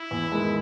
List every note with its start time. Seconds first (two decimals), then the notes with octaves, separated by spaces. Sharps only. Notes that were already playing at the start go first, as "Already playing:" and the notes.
Already playing: E4
0.11 E2
0.32 D#3 G#3